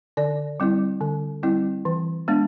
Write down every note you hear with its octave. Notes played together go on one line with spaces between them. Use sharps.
D3 D5
G3 C4 E4
D3
G3 C4 E4
E3
G#3 B3 D4